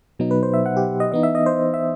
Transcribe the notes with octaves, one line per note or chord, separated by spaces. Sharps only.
B2 F#3 B3 D#4
B4
C5
E5
F#5
G4
D#5
E3 B3 D#4 D#5
E5
D#5
C5
E5